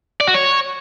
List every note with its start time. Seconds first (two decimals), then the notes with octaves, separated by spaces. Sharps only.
0.21 D5
0.27 F#4
0.34 C#5